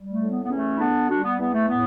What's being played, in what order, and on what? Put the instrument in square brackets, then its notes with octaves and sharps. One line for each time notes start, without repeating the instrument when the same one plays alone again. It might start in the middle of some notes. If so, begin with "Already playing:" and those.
Already playing: [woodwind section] G3
A3
A2
B3
B3
E2 A3 C#4
E4
D3 B3 D4
G3 D4 F#4
B3
E2 B3
A3
A2 B3